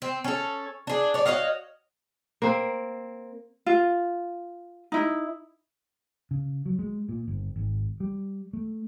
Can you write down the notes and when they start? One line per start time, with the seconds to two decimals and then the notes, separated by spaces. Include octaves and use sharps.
0.02 C4
0.24 C#4 A4
0.87 D4 G#4
1.14 C#5 D5
1.26 F#4 C#5 D#5 F5
2.42 A#3 C4
3.66 F4
4.92 D#4 E4
6.31 C#3
6.66 F#3
6.79 G#3
7.09 A#2
7.27 G1
7.56 G#1
8.00 G3
8.53 A3